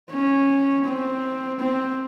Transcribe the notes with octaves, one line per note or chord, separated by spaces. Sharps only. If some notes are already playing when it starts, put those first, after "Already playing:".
C#4
C4
C4